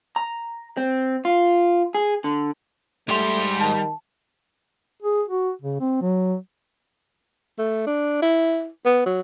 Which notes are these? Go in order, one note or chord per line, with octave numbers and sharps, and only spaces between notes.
A#5
C4
F4
G#4
D3
G#2 G3 A3 C6
D#3 A5
G#4
F#4
C#3
C4
F#3
A3
D4
E4
B3
F#3